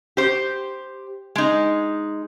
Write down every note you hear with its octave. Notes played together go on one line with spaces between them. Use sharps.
G4 C5
G#3 D#4